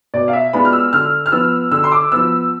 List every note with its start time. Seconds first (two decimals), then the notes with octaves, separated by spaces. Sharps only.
0.14 B2 D5
0.28 F5
0.33 E5
0.53 G#3 B3 D4 F4 B5
0.65 F6
0.73 E6
0.93 D3 F6
1.26 F6
1.32 F3 B3 E6
1.71 D3 E6
1.84 C6
1.92 D6
2.12 F3 B3 E6